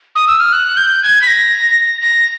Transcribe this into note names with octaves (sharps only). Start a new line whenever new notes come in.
D#6
E6
F6
F#6
G6
G#6
B6
A#6
A#6